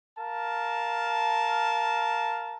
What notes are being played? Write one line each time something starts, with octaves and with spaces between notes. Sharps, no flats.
A#4 F5 A5